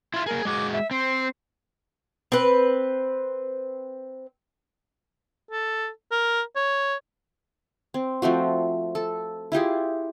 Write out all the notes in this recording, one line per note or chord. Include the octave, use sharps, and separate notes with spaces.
E4 F4 C6
A#3 G#4 A#4
G#3 F#4 G#4 D6
E5
C4 C5
C4 B4
A4
A#4
C#5
C4
F3 A3 C4 F#4
A4
E4 F4 G4 G#4